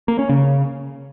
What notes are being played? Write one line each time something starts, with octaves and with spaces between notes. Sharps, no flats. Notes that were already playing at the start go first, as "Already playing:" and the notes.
A#3
C#4
C#3